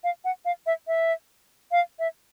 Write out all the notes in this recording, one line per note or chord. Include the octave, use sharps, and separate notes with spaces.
F5
F#5
F5
E5
E5
F5
E5